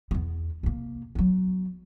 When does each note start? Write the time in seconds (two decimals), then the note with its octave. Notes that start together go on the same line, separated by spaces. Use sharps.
0.11 E2 B3
0.63 C3 A#3
1.15 F#3 B3